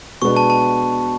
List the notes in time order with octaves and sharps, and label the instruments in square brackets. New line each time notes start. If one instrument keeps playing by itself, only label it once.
[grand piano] B2 G#3 B3 D4 [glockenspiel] C#6
[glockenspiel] A5
A5